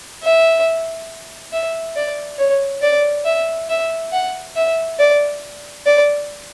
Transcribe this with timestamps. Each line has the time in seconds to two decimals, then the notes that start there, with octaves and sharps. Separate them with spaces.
0.23 E5
1.52 E5
1.96 D5
2.38 C#5
2.82 D5
3.25 E5
3.69 E5
4.12 F#5
4.56 E5
4.99 D5
5.86 D5